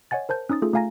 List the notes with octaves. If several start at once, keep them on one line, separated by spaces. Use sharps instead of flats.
C#5 D#5 F#5 G#5 A6
A#4 C5 A5 G6
C#4 D#4 D#6 A6
A3 F4 G#4 A4
A3 F4 F5 G#5 A#5 A#6